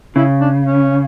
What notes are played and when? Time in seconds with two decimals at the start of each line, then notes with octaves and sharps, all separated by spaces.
0.16 C#3 E4
0.41 D4
0.67 C#4